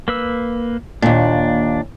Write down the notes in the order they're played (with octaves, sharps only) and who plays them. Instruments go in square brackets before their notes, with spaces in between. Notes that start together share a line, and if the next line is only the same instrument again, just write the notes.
[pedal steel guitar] A#3 B4 E6
[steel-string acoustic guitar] D#2 A#2 [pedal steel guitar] D4